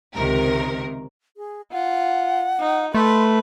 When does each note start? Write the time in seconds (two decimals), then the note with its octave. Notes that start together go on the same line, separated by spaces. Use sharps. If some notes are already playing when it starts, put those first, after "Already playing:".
0.14 C#2 C3 D#3 A#4
1.37 G#4
1.72 F4 F#5
2.60 D#4
2.94 A3 B4 C6